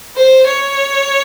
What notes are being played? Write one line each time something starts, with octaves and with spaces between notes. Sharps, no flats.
C5
C#5